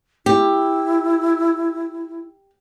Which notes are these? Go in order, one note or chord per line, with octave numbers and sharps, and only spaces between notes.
E4 G4